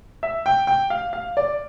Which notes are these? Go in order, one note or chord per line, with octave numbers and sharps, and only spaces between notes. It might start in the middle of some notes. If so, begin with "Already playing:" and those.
E5
G5
G5
F5
F5
D5